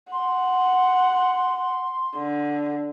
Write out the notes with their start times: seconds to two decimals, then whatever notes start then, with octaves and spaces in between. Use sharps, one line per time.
0.12 F#5 C6
2.16 D3